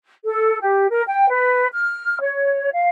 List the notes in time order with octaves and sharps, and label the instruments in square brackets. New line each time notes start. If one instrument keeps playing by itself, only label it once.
[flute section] A4
G4
A#4
G5
B4
F6
C#5
F5